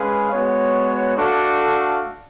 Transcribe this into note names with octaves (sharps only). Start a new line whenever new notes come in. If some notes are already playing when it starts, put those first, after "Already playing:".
Already playing: G#3 C#4 G#4 B4 F5
G#3 B3 F#4 C#5
A3 D4 F#4 A4 F5